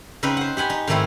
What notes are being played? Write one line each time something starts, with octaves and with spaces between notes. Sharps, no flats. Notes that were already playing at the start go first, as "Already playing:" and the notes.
C#3 C4 D#4 B4
C5 F#5
G4 F#5 G#5 B5
D#4
G#2 D#3 F3 A3 C4 E4